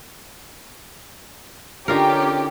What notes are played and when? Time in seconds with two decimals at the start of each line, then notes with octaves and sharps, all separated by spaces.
1.88 D3 C#4 D#4 F4 G4 A#4